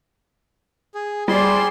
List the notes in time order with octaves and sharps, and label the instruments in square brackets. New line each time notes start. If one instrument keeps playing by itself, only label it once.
[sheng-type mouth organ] G#4
[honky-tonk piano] G3 [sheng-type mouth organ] G#4 C6 [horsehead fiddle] C5 D5